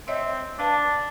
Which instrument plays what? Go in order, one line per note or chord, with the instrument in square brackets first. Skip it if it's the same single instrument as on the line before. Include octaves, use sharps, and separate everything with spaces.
[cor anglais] C4 [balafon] C#5 D#5 E5
[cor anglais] D4 [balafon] B4 F5 A5